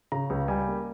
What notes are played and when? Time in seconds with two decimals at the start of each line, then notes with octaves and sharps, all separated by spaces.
0.12 C#3 A#5
0.30 C#2
0.48 G3 G#5
0.67 A#3